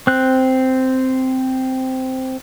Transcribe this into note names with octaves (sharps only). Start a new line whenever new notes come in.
C4 F#6